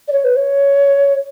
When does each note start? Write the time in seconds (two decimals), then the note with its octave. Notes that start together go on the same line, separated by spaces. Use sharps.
0.08 D5
0.12 C#5
0.24 B4
0.36 C#5